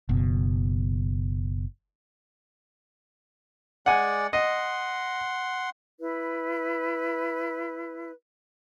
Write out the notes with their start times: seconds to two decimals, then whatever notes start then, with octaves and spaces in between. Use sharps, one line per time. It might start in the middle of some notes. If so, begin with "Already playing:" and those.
0.09 F#1 B2
3.86 G#3 D5 F#5 G#5
4.33 D#5 F#5 C6
6.00 E4 B4